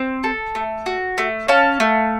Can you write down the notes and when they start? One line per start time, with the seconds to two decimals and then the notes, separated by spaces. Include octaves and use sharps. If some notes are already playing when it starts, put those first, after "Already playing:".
Already playing: C4
0.24 A4
0.55 A3
0.86 F#4
1.18 A3
1.48 C#4 F5 A5
1.80 A3